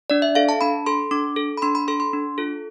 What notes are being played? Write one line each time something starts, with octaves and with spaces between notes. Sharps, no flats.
D4 D5
E5
A4 F5
A5
D4 B5
A4 C6
D4 D6
A4
B5
D4 C6
B5
A4 C6
C6
D4
F4 A4